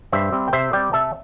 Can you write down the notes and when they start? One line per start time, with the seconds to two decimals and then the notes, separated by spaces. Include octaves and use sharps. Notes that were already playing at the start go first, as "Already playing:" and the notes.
0.12 G2 C5 E5
0.32 G3 C4
0.48 G5
0.53 C3 C5 E5
0.73 G3 C4 D5 G5
0.93 C3 E5 A5